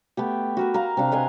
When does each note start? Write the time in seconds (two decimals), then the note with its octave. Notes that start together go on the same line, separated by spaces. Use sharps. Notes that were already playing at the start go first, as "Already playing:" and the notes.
0.17 A3 B3 G4
0.57 F#4 A#4 B4
0.74 A#4 F5
0.97 C3 D4 F5
1.11 B4 D#5 F5 G#5